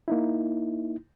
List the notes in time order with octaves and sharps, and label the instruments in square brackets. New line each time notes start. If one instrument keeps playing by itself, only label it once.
[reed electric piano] A#3 D#4 E4